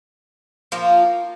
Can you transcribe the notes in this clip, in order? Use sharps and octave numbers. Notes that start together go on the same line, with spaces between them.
F3 A#3 F4